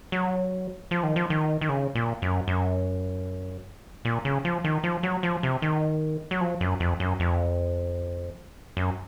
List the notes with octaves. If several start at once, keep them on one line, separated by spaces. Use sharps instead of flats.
F#3
F3
D#3
F3
D#3
D#3
C#3
A#2
F#2
F#2
A#2
C#3
F3
D#3
F3
F#3
F3
C3
D#3
F#3
F3
F#2
F2
F#2
F2
F#2